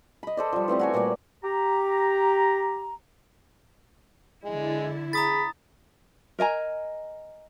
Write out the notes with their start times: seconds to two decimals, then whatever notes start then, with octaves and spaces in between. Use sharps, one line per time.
0.23 D#5 B5
0.37 A4 C5 D5
0.53 F3 G3
0.68 E3 A3 C4 G4
0.79 F#4 C#5 G#5
0.94 A#2 G3 A3 D5
1.44 G4 A#5
4.44 D3 G#3 E4
5.13 G#4 A#5 B5 D#6 A6
6.39 A#4 D#5 G#5 A#5